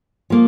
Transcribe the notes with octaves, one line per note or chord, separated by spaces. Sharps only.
F3 A#3